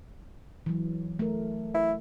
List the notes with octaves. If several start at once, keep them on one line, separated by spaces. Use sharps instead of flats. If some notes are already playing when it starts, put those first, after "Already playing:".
E3 F#3
A3 A#4
E4